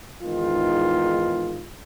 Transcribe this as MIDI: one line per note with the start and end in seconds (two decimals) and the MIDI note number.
0.23 1.67 40
0.23 1.67 44
0.23 1.67 51
0.23 1.67 65